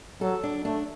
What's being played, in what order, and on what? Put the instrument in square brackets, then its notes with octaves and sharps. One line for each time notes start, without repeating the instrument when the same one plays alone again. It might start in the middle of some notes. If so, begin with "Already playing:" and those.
[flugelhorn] F#3 [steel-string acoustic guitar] A4
[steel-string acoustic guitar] D4
[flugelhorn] A3 [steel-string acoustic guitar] D4